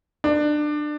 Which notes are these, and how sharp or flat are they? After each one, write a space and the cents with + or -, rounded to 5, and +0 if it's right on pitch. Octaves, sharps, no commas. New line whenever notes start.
D4 +25